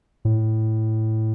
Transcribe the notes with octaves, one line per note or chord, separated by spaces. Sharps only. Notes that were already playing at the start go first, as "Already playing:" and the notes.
A2